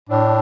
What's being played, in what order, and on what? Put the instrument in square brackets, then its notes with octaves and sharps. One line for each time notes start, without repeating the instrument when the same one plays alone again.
[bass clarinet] A2 [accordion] D4